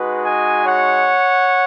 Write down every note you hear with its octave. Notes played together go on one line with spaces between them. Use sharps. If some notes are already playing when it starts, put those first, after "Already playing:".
Already playing: G#3 D#4 F#4 B4
D#5 G#5
C#5 F#5